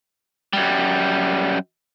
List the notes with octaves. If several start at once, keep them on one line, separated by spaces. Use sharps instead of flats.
F#2 G3